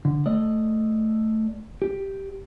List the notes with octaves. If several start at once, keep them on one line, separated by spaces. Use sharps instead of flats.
D3
A3 D5 D#5
G4